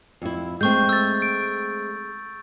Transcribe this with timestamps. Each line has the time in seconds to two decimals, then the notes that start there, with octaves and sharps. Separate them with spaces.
0.22 F2 E4
0.61 G#3 A3 C4 C#6 G6
0.89 E6 A6
1.22 D7